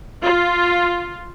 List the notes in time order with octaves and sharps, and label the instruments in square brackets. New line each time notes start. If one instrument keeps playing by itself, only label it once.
[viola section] F4